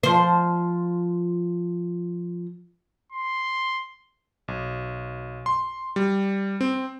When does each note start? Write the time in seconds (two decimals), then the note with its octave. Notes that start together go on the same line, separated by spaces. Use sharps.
0.03 F3 C5
3.13 C6
4.48 B1
5.46 C6
5.96 G3
6.61 C4